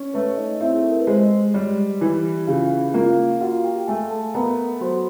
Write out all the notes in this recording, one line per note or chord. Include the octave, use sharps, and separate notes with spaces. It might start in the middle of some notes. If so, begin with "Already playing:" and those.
Already playing: C#4
A3 B4
D#4 D#5
C4 E4 E5
G#4
A4
A#4
B4
G#3 C5
G3 C#5
E3
C#3 F4 F5
A#3 F4 F5
F4 F#4 F#5
G4 G5
A3 G#4 G#5
A4 A5
B3 A#4 A#5
F#3 C5 C6